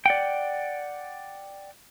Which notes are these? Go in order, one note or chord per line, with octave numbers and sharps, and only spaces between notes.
D5 F#5 G5